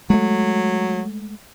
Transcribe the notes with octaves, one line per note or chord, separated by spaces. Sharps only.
F#3 G#3 A3